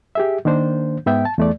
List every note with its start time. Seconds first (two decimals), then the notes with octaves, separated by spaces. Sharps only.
0.15 G4 G#4 E5
0.45 D#3 A#3 D4 C5
1.06 G#2 B3 E5 G5
1.25 A5
1.38 E2 A3 D5